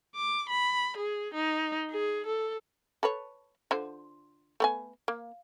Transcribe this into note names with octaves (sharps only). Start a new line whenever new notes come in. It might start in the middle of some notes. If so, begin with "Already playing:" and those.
D6
B5
G#4
D#4
G#4
A4
A4 B4 C#5
D3 F4 C5
A3 B3 G#5
A#3